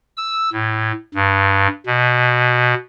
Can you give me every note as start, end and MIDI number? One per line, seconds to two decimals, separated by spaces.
0.17 0.49 88
0.53 0.92 45
1.15 1.67 43
1.86 2.74 47